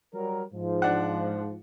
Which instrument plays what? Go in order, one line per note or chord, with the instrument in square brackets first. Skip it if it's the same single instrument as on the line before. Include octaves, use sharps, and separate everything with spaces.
[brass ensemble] F#3 G3 A#4
G#2 F3
[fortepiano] D4 F#5